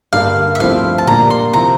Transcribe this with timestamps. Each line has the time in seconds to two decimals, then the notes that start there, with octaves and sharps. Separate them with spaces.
0.13 G2 D3 G3 A#3 F5
0.55 E5
0.59 G2 F3 A3 C4 E4 F5
0.98 A5
1.07 A#2 G3 A#3 D4 A#5
1.30 C6
1.53 C3 F3 C4 E4 A#5